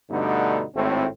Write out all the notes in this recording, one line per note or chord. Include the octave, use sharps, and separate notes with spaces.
G2 B2 D3 A3 B3 D#4
G#1 A2 C4